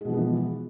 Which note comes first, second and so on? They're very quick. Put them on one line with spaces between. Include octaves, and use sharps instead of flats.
G#3 B2 F3 B3 E3